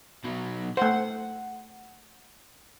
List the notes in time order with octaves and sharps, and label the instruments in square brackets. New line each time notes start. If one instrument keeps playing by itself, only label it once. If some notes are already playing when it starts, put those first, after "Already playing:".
[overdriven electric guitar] B2 F#3
[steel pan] A3 C5 [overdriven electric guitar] F#5